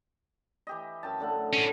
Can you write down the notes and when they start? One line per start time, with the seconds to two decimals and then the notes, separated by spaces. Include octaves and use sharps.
0.67 E3 G4 D#5
1.03 F#2 G5 A5
1.20 D3 A3 F#5
1.53 A2 C#4